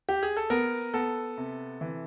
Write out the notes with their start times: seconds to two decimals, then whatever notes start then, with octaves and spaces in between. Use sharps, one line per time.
0.09 G4
0.23 G#4
0.37 A4
0.50 B3 A#4
0.94 B3 A4
1.38 C3
1.81 E3